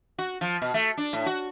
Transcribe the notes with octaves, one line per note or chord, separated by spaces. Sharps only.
F#4
F3
B2
A3
D4
A2
F#4